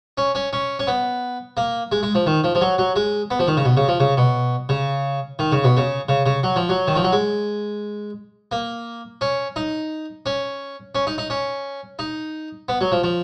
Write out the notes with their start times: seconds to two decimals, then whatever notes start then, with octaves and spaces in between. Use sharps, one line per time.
0.18 C#4
0.35 C#4
0.53 C#4
0.79 C#4
0.87 B3
1.57 A#3
1.92 G#3
2.03 G#3
2.15 F3
2.26 D#3
2.44 F3
2.55 F3
2.61 F#3
2.78 F#3
2.96 G#3
3.31 B3
3.39 F3
3.47 D#3
3.57 C#3
3.65 B2
3.77 C#3
3.88 F3
4.00 C#3
4.17 B2
4.69 C#3
5.39 D#3
5.52 C#3
5.64 B2
5.77 C#3
6.09 C#3
6.26 C#3
6.43 F#3
6.56 F3
6.69 F#3
6.87 D#3
6.96 F3
7.04 F#3
7.12 G#3
8.52 A#3
9.21 C#4
9.56 D#4
10.26 C#4
10.95 C#4
11.07 D#4
11.18 D#4
11.30 C#4
11.99 D#4
12.69 B3
12.81 F#3
12.92 F3
13.04 F3